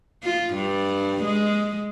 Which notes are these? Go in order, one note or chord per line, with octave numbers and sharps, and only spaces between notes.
F4
G2
G#3